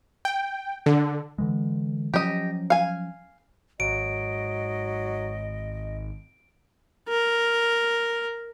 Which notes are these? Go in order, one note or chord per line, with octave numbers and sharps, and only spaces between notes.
G5
D3
D3 E3 G#3
F3 F#3 C#4 G4 D#5
F5 G#5
G#1 F#3 D#5 D7
A#4